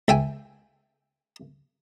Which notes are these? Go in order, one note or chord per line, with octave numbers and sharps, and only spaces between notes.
C#2 E5 G5 G#5